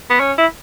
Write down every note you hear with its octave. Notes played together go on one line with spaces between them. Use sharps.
B3
C#4
E4